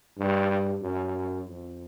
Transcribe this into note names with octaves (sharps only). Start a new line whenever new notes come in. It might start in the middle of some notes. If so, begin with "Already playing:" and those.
G2
F#2
F2